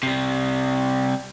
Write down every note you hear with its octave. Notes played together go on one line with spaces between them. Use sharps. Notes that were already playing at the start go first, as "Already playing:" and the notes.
C3 G3